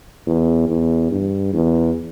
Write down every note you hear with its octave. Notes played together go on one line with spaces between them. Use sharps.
E2
E2
G2
E2